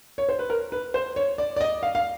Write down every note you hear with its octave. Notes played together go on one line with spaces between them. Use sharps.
C#5
C5
B4
A#4
B4
C5
C#5
D5
D5
D#5
F5
F5